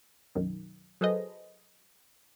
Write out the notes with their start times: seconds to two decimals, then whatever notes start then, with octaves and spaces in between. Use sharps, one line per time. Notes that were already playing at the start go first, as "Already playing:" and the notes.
0.35 B1 F#2 D#3
1.01 F#3 G#4 A4 B4 C5 D#5